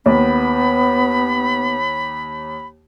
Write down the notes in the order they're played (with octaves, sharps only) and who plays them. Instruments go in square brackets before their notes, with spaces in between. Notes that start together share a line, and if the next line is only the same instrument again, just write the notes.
[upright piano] D#2 [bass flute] B3 [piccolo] B5